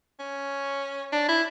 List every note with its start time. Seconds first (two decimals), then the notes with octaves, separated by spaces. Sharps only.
0.19 C#4
1.12 D4
1.28 E4